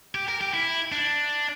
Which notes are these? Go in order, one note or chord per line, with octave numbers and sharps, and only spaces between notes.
G4
A#4
G4
E4
D4